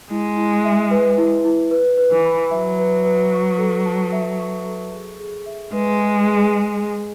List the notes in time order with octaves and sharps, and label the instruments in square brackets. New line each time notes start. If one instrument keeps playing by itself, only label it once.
[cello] G#3 [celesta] E4
[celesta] E4
E5
B4
E4
E4
B4
B4
[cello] E3
[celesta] B5
[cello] F#3 [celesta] E5
[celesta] B4
B4
C#6
A4
A5
E5
C#6
A4
G#4
G#4
E5
[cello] G#3 [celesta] B4
[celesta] G#4
G#4
G#4
G#4